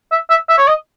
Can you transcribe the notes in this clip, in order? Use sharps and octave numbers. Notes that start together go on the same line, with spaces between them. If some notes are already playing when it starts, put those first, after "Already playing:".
E5
E5
E5
C#5
D#5